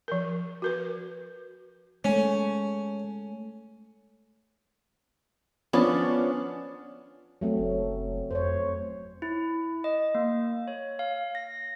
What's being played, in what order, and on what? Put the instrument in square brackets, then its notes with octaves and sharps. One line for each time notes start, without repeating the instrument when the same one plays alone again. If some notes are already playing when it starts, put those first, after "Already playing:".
[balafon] F3 A#4
F#4 A#4 B4
[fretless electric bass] G#3 A3 [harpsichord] C#4
[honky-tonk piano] F3 C#4 D4 [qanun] B3 A5
[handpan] F#3 A3 C4
[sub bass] F#1
[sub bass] F2 [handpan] C5 C#5
[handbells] E4
D#5
A#3
C#5
F5
A#6